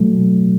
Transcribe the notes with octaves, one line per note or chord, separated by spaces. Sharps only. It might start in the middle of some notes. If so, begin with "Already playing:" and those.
Already playing: B2 F#3 A3